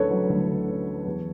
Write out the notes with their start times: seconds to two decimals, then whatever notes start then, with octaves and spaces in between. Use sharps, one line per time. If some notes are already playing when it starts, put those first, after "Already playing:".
Already playing: D2 D3 F#3 C#4 A4 B4 C#5
0.11 F#3
0.30 D2
0.49 D3
0.68 C#4
0.87 F#3
1.06 E2